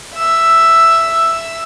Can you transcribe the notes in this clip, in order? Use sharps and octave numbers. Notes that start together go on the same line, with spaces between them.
E5 E6